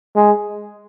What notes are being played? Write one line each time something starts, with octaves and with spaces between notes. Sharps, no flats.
G#3